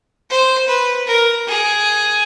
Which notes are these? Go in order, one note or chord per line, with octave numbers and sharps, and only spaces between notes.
C5
B4
A#4
G#4